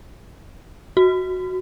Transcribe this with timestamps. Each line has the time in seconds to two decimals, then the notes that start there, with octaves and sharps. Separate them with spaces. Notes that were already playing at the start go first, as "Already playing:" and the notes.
0.97 F#4